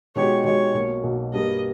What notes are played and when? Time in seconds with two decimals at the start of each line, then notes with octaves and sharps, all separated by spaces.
0.16 B2 G#3 D#4 G4 C#5
0.44 B2 G#3 D#4 G4 C#5
0.74 B1 B2 A#3
1.04 B1 B2 A#3
1.33 G2 G3 A#3 D#5